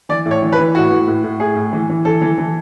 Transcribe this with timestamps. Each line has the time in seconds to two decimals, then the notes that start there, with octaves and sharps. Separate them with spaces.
0.09 E3 D5
0.25 A2
0.31 C#5
0.42 E3
0.52 B4
0.58 E3
0.75 A2 F#4
0.92 A2
1.07 A2
1.24 A2
1.40 A2 G#4
1.56 A2
1.72 E3
1.90 E3
2.05 E3 A4
2.22 E3
2.38 E3